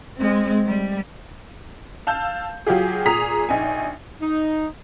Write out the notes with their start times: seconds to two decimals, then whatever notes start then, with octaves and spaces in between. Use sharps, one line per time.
0.17 G#3 C4
0.66 G3
2.07 F5 A5 E6 G6
2.67 F#3 F4 G4 G#4
3.06 A#2 G#4 A#5 D#6 B6 F7
3.49 A#1 D#4 G#5
4.21 D#4